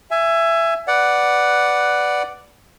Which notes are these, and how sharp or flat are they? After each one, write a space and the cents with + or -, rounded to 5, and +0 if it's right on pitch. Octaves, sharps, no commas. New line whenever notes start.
E5 +20 G#5 +0
B4 +0 D5 +0 F#5 +0